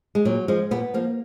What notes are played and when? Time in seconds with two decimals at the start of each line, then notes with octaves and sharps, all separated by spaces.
0.15 G#3
0.25 A#2 F#3
0.48 F3 G#3
0.71 A#2 B3
0.94 F3 A#3